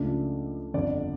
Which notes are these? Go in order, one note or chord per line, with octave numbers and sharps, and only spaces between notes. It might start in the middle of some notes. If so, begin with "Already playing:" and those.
Already playing: C#2 C#3 F3 A3 D4 D5
G1 F2 D3 D5